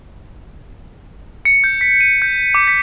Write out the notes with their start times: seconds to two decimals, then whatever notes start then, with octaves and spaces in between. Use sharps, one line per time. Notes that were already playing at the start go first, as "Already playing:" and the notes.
1.45 C#7
1.64 G6
1.81 B6
2.01 D#7
2.22 G6
2.55 D6
2.68 B6